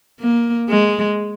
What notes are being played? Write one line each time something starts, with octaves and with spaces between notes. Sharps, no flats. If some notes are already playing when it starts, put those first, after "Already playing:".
A#3
G#3